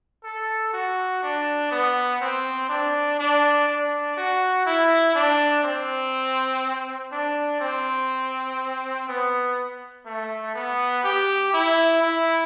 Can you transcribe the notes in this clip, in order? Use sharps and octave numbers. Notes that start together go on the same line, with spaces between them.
A4
F#4
D4
B3
C4
D4
D4
D4
F#4
E4
D4
C4
D4
C4
B3
A3
B3
G4
E4
E4